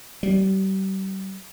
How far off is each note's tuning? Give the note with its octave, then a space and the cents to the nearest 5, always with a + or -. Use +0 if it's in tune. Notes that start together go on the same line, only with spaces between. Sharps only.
G3 -35